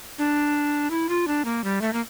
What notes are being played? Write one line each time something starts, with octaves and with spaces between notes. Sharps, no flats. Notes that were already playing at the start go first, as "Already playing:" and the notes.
D4
E4
F4
D4
A#3
G3
A3
A#3